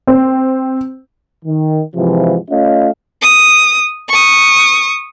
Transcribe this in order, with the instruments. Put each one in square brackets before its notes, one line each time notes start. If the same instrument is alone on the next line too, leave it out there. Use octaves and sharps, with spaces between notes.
[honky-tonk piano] C4
[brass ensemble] D#3
G#2 C3 E3 F3
A3 C#4 F4 D#5 F5
[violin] D#6
C#6 D#6